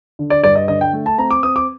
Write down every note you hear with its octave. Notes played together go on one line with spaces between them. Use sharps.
D3
D5
G2 D5
D#5
D3 D#5
G5
A3
A5
C4 A#5
D6
C4 D#6
D6